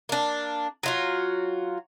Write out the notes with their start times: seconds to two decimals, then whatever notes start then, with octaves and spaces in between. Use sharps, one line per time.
0.09 A#3 D4
0.83 F#3 F4 F#4